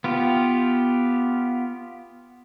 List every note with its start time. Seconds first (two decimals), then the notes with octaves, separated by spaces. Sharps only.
0.04 B3 F4 G4